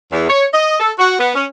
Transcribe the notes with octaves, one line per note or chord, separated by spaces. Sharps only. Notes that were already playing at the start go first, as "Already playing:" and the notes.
E2
C#5
D#5
A4
F#4
B3
C#4